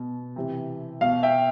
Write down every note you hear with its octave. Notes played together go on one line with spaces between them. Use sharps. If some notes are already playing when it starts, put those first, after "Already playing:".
Already playing: B2
C3 E3
B2 F5
E5 G5